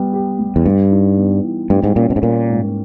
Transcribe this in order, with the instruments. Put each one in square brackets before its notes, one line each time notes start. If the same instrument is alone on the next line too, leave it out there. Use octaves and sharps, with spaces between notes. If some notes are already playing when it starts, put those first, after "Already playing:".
Already playing: [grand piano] G3 B3
G4
G3
[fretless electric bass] E2
[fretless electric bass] G2 [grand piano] G3
[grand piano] D#4
B3
E3
[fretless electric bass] G2 [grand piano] G3
[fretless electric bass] G#2
[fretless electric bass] A#2 [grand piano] C#4
[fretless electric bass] B2
G#2
[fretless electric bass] A#2 [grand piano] A#3
[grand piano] G#2